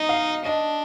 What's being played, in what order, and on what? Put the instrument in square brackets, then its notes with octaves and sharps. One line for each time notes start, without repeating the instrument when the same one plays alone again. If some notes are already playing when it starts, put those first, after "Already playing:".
Already playing: [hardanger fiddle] D#4 [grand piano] D#5
[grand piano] F5
[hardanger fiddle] D4 [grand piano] D#5